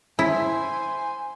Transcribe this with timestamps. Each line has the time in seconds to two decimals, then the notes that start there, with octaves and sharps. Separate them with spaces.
0.19 E4 C5 G#5